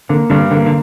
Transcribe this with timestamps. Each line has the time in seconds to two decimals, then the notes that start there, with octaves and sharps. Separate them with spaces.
0.09 D3 A#3
0.30 G2 D3
0.51 D3 A#3
0.66 D3